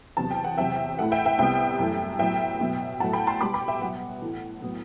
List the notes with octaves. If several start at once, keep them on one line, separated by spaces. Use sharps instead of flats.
E2 C3 F#3 B3 A5
G5
F#5
E2 C3 F#3 E5 G5
A2 E3 A3 F#5
E5 G5
E5 G5
C2 C3 G3 B3 E5 G5
F#2 E3 A3
A2 F#3 B3 E5 G5
B2 F#3 B3
A2 F#3 A3 F#5 A5
G5 B5
A5 C6
B2 G3 B3 B5 D6
G5 B5
E5 G5
B2 F#3 B3 F#5
A2 E3 A3
A2 F#3 B3